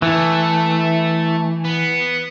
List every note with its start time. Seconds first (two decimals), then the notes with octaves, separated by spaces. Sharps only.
0.02 E3 A3
1.65 B3